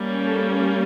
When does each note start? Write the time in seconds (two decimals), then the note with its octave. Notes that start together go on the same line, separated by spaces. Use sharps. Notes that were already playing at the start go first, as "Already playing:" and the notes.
Already playing: G3 A#3 C#4
0.27 A4